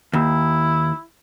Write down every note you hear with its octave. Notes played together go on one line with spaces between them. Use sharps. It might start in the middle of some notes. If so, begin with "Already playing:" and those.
D#2 E4